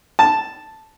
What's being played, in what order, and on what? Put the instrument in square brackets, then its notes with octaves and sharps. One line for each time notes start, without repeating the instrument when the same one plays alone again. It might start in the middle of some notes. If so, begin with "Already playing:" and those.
[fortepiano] A5